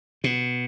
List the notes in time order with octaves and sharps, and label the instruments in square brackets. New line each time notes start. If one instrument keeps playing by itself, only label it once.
[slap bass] B2